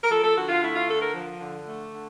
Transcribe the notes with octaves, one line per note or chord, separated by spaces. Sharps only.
A#4
F3 A4
A4
D3 F#4
F4
A3 E4
F4
D3 A4
A#4
F3
D3
A3
D3